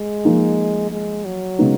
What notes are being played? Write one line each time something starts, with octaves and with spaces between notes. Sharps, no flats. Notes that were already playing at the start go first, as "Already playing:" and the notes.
Already playing: G#3
F3 A#3 D#4
G#3
F#3
C#3 G#3 B3 D#4